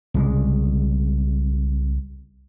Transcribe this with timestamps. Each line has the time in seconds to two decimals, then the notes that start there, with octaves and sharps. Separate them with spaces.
0.14 C2 C#3 G#3